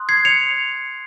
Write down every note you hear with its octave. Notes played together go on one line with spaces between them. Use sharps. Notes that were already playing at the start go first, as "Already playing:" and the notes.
Already playing: C6 D#6 F#6
G#6 C7
C#7 F7